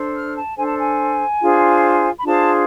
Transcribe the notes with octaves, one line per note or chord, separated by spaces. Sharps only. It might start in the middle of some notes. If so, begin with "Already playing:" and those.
Already playing: D4 A4 C5
F6
A5
D4 A4 C5 G#5
A5
G#5
D4 F4 G#4 C5
B5
D4 F4 G#4 C5 A5